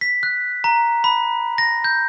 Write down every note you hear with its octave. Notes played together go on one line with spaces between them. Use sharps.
B6
F#6
A#5
B5
A#6
G6